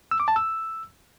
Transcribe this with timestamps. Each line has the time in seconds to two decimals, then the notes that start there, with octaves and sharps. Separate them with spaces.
0.11 E6
0.20 D6
0.28 A5
0.36 E6